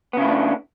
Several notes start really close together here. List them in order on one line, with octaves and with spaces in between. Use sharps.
B3 C#3 E4 A3 D4